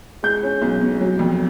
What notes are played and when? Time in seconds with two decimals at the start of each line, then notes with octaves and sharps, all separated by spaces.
0.23 G#3 G6
0.43 C#4
0.62 B1
0.81 B2
1.01 F#3
1.19 F2